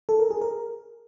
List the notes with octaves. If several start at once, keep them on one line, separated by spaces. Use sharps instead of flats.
A4
A#4
G#4
A#4